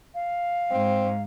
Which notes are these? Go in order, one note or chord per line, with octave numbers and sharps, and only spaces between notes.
F5
G#2 C4